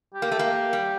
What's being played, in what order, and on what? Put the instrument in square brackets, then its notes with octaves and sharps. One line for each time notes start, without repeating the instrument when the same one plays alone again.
[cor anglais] G4
[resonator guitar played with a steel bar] A#3
A3
A#3
G3